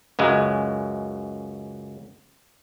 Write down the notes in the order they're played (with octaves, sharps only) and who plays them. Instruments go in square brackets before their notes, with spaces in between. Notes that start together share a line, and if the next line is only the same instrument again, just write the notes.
[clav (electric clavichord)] C#2 F#2 G#3